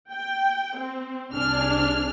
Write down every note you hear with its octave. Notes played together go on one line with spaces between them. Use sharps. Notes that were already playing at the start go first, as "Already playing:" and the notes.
G5
C4
C2 C3 D4 G#4 F6